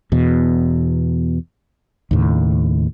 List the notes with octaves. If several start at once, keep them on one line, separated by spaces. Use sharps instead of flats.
E2 B2
D#2 A2 C#3